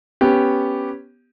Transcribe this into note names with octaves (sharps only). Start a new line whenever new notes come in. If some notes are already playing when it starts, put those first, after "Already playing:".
B3 C#4 G4